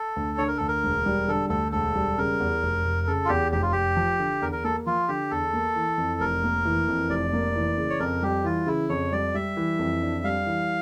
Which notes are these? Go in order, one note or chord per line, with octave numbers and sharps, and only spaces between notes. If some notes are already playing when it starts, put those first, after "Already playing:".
Already playing: A4
D2
D3 C#5
A#4
D2 A4
A#4
E1
G3
D3 A4
D2 A4
E1 A4
G3
C#3 A#4
E2
F1
F1
C#3 A4
F4
E2 G4
F1 G4
F4
F1 G4
F3
D3
E2 A#4
A#4
A#3 A4
F3 F4
D3 G4
E2 A4
A#3
E3
F2
F1 A#4
A#3
E3
F2
F1 D5
A#3
E3
C#3
C#5
F2 A#4
G3 G4
E3 F4
C#3 E4
F2 C#5
G3 D5
G3 E5
E3
F2
D4
G3 F5
E3